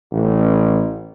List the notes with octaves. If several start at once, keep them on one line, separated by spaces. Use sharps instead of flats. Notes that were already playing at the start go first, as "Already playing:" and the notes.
A1